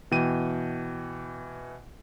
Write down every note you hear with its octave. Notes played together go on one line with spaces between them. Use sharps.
B2 E3 G5 D#7